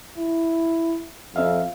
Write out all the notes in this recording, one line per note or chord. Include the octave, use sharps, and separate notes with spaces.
E4
F2 C4 E5 F5